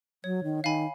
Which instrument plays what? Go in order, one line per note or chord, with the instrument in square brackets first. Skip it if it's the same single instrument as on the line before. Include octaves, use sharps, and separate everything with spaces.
[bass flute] F#3 [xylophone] C#5
[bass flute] D#3
[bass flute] D#3 [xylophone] F5 G#5 B5